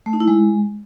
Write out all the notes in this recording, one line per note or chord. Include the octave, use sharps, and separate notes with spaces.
A3
D#4
E4
G#3